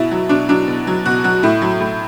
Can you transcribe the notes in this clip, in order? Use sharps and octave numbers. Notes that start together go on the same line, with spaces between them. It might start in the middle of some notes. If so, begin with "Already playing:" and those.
Already playing: B2 E4
F#3
B2 D4
F#3 D4
B2
F#3
B2 F#4
F#3 F#4
A2 E4
F#3
A2